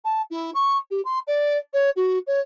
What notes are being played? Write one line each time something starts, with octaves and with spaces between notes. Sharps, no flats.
A5
E4
C#6
G4
C6
D5
C#5
F#4
C#5